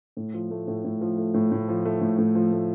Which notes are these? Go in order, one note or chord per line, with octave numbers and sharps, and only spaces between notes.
A2
F3
A3
A2
A2
F3
A3
A2
A2
F3
A3
A2
A2
F3
A3